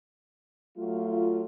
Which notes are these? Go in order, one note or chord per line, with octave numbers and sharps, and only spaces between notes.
F#3 A3 F4